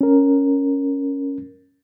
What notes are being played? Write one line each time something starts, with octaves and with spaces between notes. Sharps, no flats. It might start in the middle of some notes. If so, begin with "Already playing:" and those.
C#4 A#4